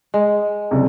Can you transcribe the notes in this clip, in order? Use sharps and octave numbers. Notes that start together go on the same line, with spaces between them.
G#3
F#1 C2